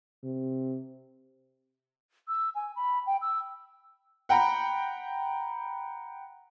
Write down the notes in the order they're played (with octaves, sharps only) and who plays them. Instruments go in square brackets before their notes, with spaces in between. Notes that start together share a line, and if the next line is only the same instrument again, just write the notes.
[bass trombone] C3
[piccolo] E6
G#5
B5
G5
E6
[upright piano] F#5 G5 A#5 B5